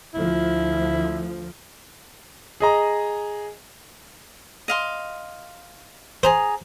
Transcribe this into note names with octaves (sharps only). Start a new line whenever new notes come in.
D2 F3 E4
G#4 D#5 A#5
D#5 F5 C6
G#4 C5 A#5 D#6